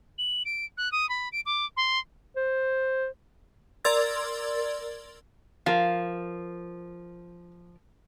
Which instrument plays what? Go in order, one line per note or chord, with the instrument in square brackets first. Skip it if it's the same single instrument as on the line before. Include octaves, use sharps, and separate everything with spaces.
[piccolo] F#7
D7
F#6
D#6
B5
D7
D6
C6
[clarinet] C5
[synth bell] A#4 D5 C6 E6 G#6 A6
[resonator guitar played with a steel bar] F3 [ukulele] A#4 F5